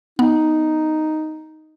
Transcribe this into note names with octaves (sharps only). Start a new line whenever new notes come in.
B3 D#4